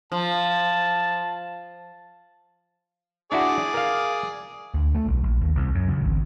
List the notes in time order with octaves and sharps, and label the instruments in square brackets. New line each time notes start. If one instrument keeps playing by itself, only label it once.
[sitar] F3 [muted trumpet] A5
[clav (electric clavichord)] D4 E4 F#4 [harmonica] G#4 D5 D6
[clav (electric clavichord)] A#4 F5
[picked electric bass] D2
A3
B1
A#1
D#2
C2
F#2
C#2
G#1